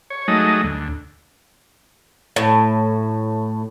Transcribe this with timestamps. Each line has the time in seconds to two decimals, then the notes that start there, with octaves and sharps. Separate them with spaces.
0.10 C#5
0.28 F#3 G#3 A3 D#4 D#5
0.64 D2
2.36 A2